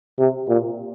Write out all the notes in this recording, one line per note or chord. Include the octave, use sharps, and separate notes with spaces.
C3
A#2